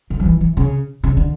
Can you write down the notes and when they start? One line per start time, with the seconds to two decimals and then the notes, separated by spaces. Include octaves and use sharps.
0.10 D3
0.20 F#3
0.25 E3
0.41 E3
0.57 C#3
1.04 C#3
1.17 D3